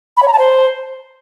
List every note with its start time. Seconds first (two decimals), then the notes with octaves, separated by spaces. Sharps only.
0.17 B5
0.22 C#5
0.28 A#5
0.33 A5
0.38 C5